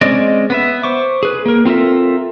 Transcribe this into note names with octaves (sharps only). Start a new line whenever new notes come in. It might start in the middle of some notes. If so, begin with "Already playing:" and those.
G#3 C4 C#4 D5 D#5
B3 B4 E5
C5 C#6 D6
G#4 B4
A#3 A#4
C4 F4 A4 A#4 E5